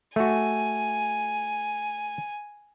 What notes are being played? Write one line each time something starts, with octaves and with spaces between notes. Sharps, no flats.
A3 F#4 G#5